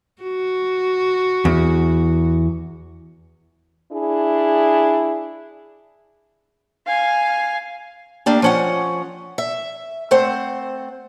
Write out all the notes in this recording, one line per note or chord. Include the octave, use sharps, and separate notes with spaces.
F#4
E2
D4 E4 G#4
F5 G#5
A3 A#3 D4 G4
F3 C#4 F#5
E5
A3 C4 C5 F#5